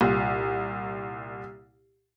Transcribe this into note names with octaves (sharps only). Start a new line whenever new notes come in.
C2 A#2